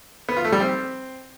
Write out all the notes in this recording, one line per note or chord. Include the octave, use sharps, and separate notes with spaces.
B3
F4
A3
G3
C4